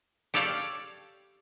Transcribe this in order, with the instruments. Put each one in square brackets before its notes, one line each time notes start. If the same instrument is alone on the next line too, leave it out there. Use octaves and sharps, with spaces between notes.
[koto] G4 A4 C#5 D5 F5